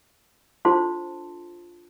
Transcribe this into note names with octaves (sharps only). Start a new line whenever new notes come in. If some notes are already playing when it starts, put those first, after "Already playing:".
D4 F4 A4 C5 A5 C6